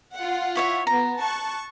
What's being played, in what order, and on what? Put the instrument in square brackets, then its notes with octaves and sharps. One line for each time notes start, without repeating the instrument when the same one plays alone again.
[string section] F4 F#5
[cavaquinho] E4 C#5 E5
[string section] B3 [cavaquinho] A#5
[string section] A5 C#6 F#6